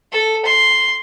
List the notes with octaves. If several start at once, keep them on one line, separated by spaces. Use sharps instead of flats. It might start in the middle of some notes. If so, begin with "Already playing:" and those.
A4
C6